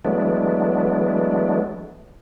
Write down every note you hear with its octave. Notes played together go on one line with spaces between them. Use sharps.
E3 F#3 G#3 A3 B3 D4